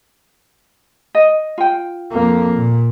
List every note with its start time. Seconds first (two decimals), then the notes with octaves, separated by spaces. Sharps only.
1.15 D#5
1.58 F4 G5
2.12 F2 A#3
2.54 A#2